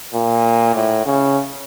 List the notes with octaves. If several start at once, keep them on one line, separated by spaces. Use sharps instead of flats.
A#2
A2
C#3